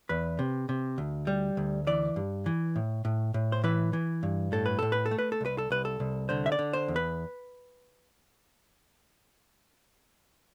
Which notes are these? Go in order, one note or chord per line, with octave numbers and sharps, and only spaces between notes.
E2 B4
C3
C3
D2
G3
D2
E3 D5
G2
E3
A2
A2
A2
C5
E3 B4
E3
G2
A2 A4
B4
A2 A4
B4
A4
A3
B4
A4
C2 B4
A4
C2 B4
A4
C2
D3 C5
E5
D5
D3
C5
E2
B4